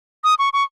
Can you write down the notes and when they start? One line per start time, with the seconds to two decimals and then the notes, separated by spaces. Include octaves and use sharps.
0.24 D#6
0.39 C#6
0.53 C#6